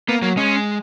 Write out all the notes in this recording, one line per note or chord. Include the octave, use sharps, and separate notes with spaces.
A#3 B3
F#3 A#3
G#3 C#4